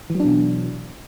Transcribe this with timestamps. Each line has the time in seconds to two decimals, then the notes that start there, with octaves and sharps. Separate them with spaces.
0.10 E3
0.15 F#3
0.20 D4
0.25 B2